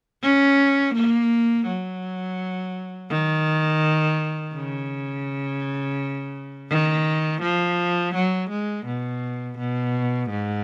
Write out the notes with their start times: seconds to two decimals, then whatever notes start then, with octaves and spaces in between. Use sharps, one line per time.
0.22 C#4
0.94 A#3
1.67 F#3
3.10 D#3
4.54 C#3
6.70 D#3
7.42 F3
8.15 F#3
8.50 G#3
8.86 B2
9.58 B2
10.30 G#2